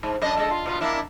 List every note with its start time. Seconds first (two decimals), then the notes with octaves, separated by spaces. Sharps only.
0.03 G#2
0.22 F#2 D4 D#5
0.38 G#3 A4 D#5
0.51 F4
0.66 B2 B3 F4
0.81 A#3 D4 E4